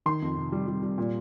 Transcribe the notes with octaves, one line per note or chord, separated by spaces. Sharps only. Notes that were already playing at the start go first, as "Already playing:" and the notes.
D#3 C6
F2
C3
G3
G3
G3
A#2